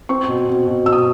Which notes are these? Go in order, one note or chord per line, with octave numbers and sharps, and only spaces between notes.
C4 C#6
B2
B2
B2
B2 E6
D#6